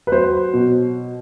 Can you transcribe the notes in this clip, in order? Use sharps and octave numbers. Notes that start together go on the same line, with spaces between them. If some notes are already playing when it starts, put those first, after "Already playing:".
B4
F#3 C5
B2